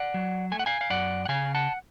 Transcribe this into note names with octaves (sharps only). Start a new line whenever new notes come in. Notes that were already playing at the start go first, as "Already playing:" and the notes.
Already playing: D5 F#5
F#3
A3 G#5
F#5
F5 G#5
F5
F#2 D5 F#5
F#5
C#3 F5 G#5
F#5 A5